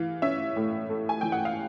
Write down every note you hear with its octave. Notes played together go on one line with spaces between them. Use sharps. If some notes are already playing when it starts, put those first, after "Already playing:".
Already playing: E3 F5
C#4 E5
A2
A3
G#5
E3 G5
F#5
F5